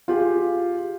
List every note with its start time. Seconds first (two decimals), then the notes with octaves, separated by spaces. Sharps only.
0.08 F4 G4 G#4